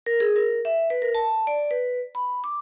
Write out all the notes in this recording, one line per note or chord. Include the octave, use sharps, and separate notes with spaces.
A#4
G#4
A#4
E5
B4
A#4
A5
D5
B4
B5
D6